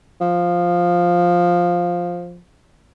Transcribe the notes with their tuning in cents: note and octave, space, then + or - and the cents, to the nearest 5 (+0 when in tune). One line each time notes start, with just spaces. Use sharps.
F3 +5